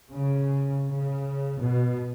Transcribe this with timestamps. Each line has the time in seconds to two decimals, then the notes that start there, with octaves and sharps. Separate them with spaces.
0.13 C#3
0.90 C#3
1.60 B2